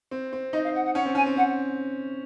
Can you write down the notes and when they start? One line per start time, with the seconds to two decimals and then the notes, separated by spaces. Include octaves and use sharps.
0.11 C4
0.33 C4
0.53 D#4 D#5
0.64 F5
0.75 F#5
0.85 F#5
0.95 C#4 F#5
1.06 C4
1.15 C#4 G#5
1.26 C4
1.36 C4 F#5